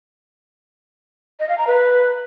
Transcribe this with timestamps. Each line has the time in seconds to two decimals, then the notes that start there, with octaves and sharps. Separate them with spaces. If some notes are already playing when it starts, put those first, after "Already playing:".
1.40 D#5
1.49 F5
1.58 A#5
1.67 B4